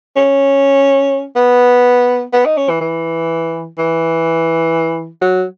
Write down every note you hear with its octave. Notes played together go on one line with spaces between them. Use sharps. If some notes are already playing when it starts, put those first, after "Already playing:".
C#4
B3
B3
D#4
C#4
E3
E3
E3
F#3